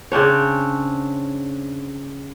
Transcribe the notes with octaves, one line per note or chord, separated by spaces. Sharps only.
C#3 C4 D4 C#5